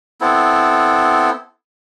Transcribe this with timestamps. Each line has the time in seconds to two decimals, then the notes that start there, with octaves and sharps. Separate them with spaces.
0.21 B3 C4 E4 A4